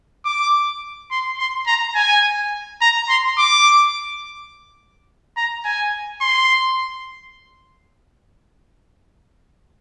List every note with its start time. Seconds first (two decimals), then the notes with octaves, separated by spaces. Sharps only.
0.25 D6
1.11 C6
1.39 C6
1.67 A#5
1.95 G#5
2.81 A#5
3.09 C6
3.38 D6
5.36 A#5
5.65 G#5
6.21 C6